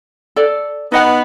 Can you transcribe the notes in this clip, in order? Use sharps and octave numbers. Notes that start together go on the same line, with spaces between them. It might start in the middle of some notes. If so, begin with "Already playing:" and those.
A4 D5
B3 D#4 D#5 F#5